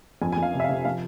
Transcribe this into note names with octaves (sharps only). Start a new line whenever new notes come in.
F2 G#5
F2 G#5
F5
C3
E5
F5
C3
F3 F5